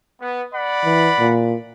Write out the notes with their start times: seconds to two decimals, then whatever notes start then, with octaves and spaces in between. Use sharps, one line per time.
0.21 B3
0.54 D5 F#5 B5
0.85 E3
1.20 A#2